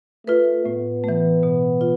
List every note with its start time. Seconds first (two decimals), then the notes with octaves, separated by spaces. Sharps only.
0.27 A3 F4 B4
0.66 A2 B3
1.04 E3 A3
1.43 B2
1.81 F4